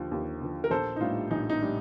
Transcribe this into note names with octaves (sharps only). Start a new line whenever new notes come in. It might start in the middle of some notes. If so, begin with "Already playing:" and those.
Already playing: D#2 D3 F3
D#2
D3 F3
A#4
A#1 A4 C5
D#4
A2 G3 D4 F4
A#1 D#4
D#4
A2 G3 D4